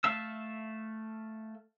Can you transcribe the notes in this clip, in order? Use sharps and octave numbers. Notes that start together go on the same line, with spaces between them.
A3 E5 F5 A5 E6